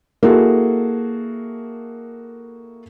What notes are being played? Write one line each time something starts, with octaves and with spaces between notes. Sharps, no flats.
A#3 E4 F#4 G#4 A4